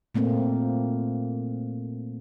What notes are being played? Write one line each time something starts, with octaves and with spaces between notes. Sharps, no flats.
A#2 A3 A#3 C4